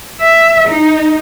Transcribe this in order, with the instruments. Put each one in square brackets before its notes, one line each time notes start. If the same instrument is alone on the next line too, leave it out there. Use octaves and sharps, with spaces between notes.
[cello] E5
D#4